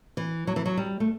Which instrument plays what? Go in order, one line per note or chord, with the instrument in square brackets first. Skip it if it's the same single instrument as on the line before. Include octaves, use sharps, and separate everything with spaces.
[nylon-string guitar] E3
F#3
E3
F#3
G3
A3